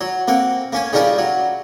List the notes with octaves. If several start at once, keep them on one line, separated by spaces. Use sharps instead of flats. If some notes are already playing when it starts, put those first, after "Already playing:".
F#3
A#3 C4 F#5
A#3 C#4 G#5
C#3 G3 D#4 F4 A#4
F#3